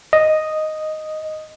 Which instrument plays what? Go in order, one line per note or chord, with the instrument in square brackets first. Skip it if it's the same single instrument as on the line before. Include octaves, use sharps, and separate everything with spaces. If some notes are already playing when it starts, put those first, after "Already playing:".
[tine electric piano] D#5